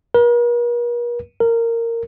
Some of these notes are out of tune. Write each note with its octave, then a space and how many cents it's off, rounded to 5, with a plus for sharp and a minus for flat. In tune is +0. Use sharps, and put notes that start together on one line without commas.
A#4 +45
A#4 -15